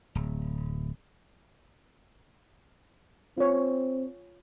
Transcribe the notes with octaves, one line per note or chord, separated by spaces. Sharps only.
D1
C4 F4 C#5